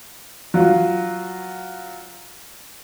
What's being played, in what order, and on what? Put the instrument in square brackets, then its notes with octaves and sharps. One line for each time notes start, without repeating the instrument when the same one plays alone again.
[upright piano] F#3 F4